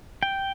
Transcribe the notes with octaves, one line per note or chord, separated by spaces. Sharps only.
G5